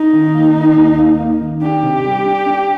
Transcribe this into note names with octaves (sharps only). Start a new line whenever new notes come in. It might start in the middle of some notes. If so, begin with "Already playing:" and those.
Already playing: D#4
D#3
A#3
D#3
D#2
A#3
A#3
D#3
D4 G4
C3
G3
D4
D4